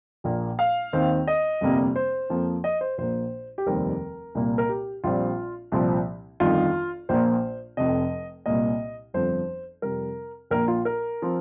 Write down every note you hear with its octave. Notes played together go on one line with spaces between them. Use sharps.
A#1 A#2 A#3
F5
D#2 D#3 C4
D#5
G1 F2 C3 G3 A#3
C5
F2 F3 A#3
D#5
C5
A#1 A#2 A#3 C5
G4
F1 D#2 D#3 G3 C4 A#4
C2 A#2 A#3
A#4
G4
A#1 A#2 G3 C4 F4
C2 A#2 F3 C4
G1 F2 D#3 F4
A#1 A#2 A#3 C5
F1 F2 C3 D#5
C2 A#2 A#3 D#5
G1 F2 F3 C5
F2 C3 G3 A#4
A#1 A#2 A#3 A#4
F4
A#4
F3 C4